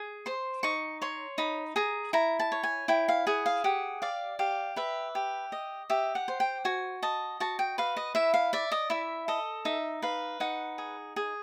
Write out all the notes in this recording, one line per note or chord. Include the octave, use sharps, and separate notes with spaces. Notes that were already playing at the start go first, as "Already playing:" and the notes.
Already playing: G#4
C5 C6
D#4 C#6
C#5 C6
D#4 B5
G#4 A#5
E4 A#5
A5
C#5
G#5
E4 G5
F5
G#4 F#5
F5
G4 F#5
D5 F5
G4 F5
B4 E5
G4
D#5
G4 E5
F#5
C5
G5
F#4 G#5
D#5 A5
F#4 A5
G5
B4 F5
D#5
E4 E5
F5
D5 E5
D#5
E4 E5
A4 D#5
D#4 E5
B4 F5
D#4 F#5
G#4
G#4